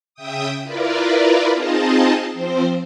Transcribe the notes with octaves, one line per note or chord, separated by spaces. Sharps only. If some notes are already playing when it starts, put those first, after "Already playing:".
C#3 E5 G5 D#6
E4 F4 A#4 B4 D5
C4 D#4 F4 G#4 D#5 A5
F3 C4 C5